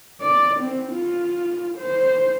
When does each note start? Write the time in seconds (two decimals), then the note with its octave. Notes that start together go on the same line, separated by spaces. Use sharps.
0.22 D5
0.60 C4
0.93 F4
1.78 C5